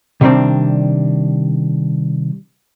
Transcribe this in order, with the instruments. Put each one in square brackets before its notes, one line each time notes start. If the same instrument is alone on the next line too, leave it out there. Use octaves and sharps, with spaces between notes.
[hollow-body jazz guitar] C3 D#3 G3 B3 C4 D4